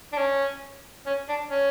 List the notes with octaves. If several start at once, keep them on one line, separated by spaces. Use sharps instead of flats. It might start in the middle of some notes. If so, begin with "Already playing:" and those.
D4
C#4
C#4
D4
C#4